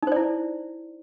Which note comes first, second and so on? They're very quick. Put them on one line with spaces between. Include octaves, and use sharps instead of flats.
D#4 C5 D5 E4